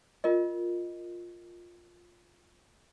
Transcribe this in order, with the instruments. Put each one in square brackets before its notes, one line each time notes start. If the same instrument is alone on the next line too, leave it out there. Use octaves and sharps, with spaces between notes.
[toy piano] F4 A#4 D#5